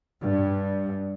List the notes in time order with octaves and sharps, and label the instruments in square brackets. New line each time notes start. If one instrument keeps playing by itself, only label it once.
[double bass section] G2